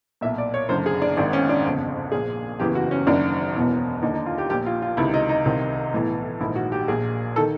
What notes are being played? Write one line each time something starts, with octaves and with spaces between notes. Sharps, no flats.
B1 A#2 E5
D5
C#5
F#1 F#2 D3 C5
G#4
D4
G#1 G#2 D#3 D4
C#4
D4
G1 F2 C#3
A#1 A#2 G#4
F#1 E2 C#3 E3 G4
F#4
C#4
F#1 F#2 D#3 D4
E1 E2 B2
D#2 D3 D#4
D#4
F4
G4
A#1 A#2 G4
F4
F4
C#2 C3 D#3 E4
D#4
D#4
C2 C3 D#3
B1 A2 E3
A#1 G#2 D#3 E4
F#4
G4
A#1 A#2 G#4
D#3 A4